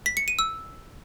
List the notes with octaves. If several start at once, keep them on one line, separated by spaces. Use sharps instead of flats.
B6
C#7
D#7
E6